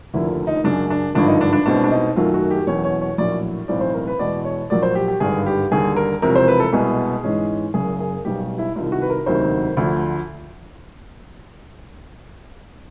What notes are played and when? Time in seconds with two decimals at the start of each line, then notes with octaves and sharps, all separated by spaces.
0.14 F1 D#2 D3 F3 A#3 E4
0.47 D#4
0.64 F#2 C#3 F#3 D4
0.90 D4
1.15 G#1 G2 D3 F3 D4
1.28 D#4
1.41 D4
1.53 D4
1.66 C2 B2 G#3 C4 D4
1.84 D4
1.91 D#4
2.16 F#2 D#3 F#3 A3 F4
2.34 F#4
2.51 G4
2.67 E2 B2 F#3 A#3 C#4 C#5
2.84 C#5
3.01 C#5
3.18 A#1 A2 F#3 A#3 D5
3.68 B1 A2 E3 G#3 C4 D5
3.81 C5
3.94 A#4
4.07 B4
4.19 E2 B2 G#3 B3 D5
4.45 C#5
4.70 A#1 A#2 F#3 A#3 D5
4.83 C5
4.95 G4
5.08 G4
5.20 G#1 G2 D3 G#4
5.46 G4
5.71 D#2 D3 G3 G#4
5.96 A#4
6.22 E1 E2 C3 F3 A#4
6.35 C5
6.48 B4
6.60 A4
6.73 C2 B2 G#3 B3 G#4
7.24 G#2 E3 G#3 C#4
7.74 F#1 F#2 C#3 G#4
8.00 G#4
8.25 B1 B2 G3 G4
8.58 E4
8.76 C2 C3 D#3 F4
8.92 F#4
9.02 B4
9.10 A#4
9.26 E1 D2 C3 D#3 F#3 C5
9.77 D2 D3 F3